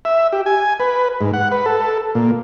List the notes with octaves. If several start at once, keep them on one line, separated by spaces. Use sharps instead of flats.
E5
G4
G#5
B4
G#2
F#5
B4
A4
A#2